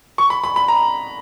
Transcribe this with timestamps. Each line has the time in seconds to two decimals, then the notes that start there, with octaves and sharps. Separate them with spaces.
0.18 C#6
0.30 B5
0.44 B5
0.56 B5
0.68 A#5